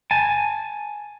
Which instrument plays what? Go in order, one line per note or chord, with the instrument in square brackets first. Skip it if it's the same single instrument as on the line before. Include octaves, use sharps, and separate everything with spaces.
[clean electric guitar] G#5 A5